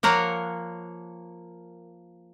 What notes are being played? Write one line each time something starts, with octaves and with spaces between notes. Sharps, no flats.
F3 A#3 A#4 C#5 F#5